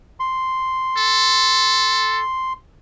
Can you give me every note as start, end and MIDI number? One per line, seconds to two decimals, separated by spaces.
0.20 2.53 84
0.98 2.22 69